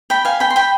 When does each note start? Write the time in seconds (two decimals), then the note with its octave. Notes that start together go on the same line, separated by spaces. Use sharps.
0.10 G5 B5
0.25 F5 G#5
0.40 G5 B5
0.50 C6
0.56 G5 B5